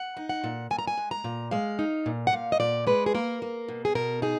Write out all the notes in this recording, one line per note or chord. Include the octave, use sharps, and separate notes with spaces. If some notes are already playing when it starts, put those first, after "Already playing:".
Already playing: F#5
D#4
F#5
A#2
A#2 G#5
A#5
G#5
G#3
A#5
A#2
G#3 F5
D#4
A#2
F#5
A#2 F5
D#5
A#2 D5
G#3 B4
G#4
A#3 A#4
A#3
B2
G#4
B2 A#4
D#4 G#4